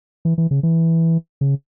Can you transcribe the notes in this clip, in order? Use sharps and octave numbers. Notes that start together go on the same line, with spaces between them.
E3
E3
C#3
E3
C#3